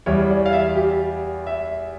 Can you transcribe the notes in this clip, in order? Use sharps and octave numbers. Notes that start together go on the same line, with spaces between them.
E2 E3 G3 C#5
D5
F5
E5
G4
E5